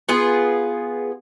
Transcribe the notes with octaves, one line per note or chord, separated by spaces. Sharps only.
B3 F4 G#4